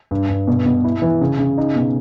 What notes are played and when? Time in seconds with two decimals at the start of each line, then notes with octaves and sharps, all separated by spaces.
0.11 G2
0.29 G2
0.47 B2
0.66 B2
0.84 E4
1.02 E3
1.21 C#3
1.39 C#3
1.58 D#4
1.75 B2